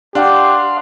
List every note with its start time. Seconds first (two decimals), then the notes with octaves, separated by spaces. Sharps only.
0.15 D4 G4 F5 F#5 C6